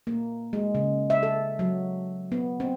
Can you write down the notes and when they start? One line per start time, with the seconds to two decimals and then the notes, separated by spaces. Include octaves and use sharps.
0.07 A#3
0.53 G#3
0.75 C#3
1.10 E5
1.23 A4
1.59 F#3
2.32 B3
2.60 C4